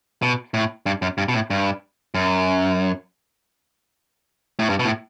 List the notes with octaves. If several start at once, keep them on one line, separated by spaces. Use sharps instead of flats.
B2
A2
G2
F#2
G2
B2
A2
G2
F#2
A2
G2
B2
A2